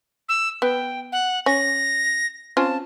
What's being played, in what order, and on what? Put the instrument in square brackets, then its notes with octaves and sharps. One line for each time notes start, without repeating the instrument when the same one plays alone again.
[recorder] E6
[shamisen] B3 [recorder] G5
[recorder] F#5
[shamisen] C#4 [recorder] A#6
[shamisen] C4 C#4 F4 [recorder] A5